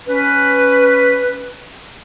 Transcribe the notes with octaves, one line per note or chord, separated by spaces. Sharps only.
C#4 B4